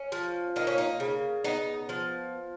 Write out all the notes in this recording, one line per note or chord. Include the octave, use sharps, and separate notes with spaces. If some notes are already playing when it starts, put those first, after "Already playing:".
Already playing: C#4
F3
A#3 D#4
C#4
D#4
C#3
B3 D#4
F3